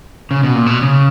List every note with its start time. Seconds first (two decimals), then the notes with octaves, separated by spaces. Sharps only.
0.31 C#3
0.43 B2
0.54 A#2
0.66 B2
0.82 C#3